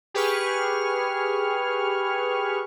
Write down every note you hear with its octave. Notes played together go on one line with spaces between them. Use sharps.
G4 G#4 B4 C#6 F6